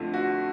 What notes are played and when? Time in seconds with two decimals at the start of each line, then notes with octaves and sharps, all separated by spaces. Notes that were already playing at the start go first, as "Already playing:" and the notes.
Already playing: F2 D3 F3 A3
0.14 F#4